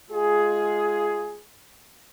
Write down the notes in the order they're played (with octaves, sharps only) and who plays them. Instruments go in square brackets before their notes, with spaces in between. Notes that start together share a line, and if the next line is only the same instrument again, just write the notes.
[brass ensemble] G#3 F4 G#4